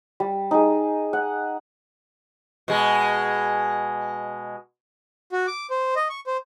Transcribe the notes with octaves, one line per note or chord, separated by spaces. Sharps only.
G3
D#4 G#4
F#5
B2 G#3
F#4
D6
C5
D#5
C#6
C5